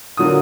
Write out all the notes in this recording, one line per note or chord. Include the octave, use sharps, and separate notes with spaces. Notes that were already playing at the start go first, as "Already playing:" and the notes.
D3 F#3 A#3 D#6